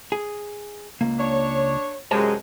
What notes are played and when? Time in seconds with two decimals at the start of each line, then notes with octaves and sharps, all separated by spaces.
0.12 G#4
1.01 C#2 A#3
1.18 D4 C#5
2.11 F#2 C3 G#3 C#5 D#5 A5